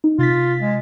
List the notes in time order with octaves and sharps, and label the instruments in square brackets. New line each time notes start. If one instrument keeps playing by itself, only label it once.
[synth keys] D#4
[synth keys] C3 A6 B6 [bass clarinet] F4
[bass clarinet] G#3